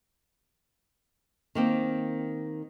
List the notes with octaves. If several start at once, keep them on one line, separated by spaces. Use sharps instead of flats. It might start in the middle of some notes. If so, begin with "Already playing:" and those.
D#3 A#3 C4